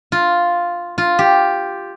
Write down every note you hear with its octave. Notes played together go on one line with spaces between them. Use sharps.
F4
F4
G4